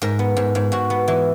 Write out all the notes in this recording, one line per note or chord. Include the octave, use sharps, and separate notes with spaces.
G#2 A#4
B3
G#2
G#2
G#2 F#4
B3
E3